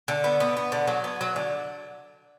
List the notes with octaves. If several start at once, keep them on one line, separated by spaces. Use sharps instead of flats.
D3
B3
B3
B3
D3
F#3
B3
F#3
D3